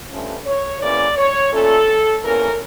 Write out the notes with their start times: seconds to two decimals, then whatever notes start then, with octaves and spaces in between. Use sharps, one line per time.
0.10 G2 F3 A3 C#4
0.45 C#5
0.81 E2 C#3 E3 A#3 C#4 D5
1.16 C#5
1.52 A#2 A3 C#4 A4
2.23 E2 E3 A#3 C#4 A#4